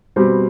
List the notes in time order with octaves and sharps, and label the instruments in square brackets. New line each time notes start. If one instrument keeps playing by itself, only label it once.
[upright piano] B2 G3 C4